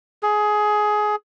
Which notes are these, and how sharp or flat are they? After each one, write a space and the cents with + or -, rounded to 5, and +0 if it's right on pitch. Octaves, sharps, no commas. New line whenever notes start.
G#4 +15